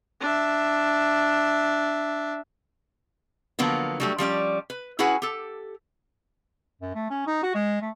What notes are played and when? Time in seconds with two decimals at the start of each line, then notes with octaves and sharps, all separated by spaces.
0.21 D4 E5
3.59 D3 F3 F#3 A#3 B3
4.00 F#3 G3 A3
4.18 F3 G3 C#4 D5
4.70 B4
4.99 C#4 E4 F#4 G#4 B4 F#5
5.22 G4 A4
6.81 F#2
6.95 A3
7.10 C#4
7.27 D#4
7.43 F#4
7.55 G#3
7.81 A3